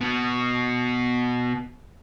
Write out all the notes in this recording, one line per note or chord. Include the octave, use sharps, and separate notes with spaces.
B2 B3